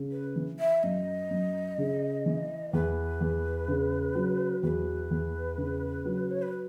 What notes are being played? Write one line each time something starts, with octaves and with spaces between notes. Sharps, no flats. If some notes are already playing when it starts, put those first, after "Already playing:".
Already playing: C#3
B4
E3
E5
F#2 D#5
F#2
C#3
E3
E2 B4
E2
C#3
F#3
E2 B4
E2
C#3
F#3
C#5
B4
B4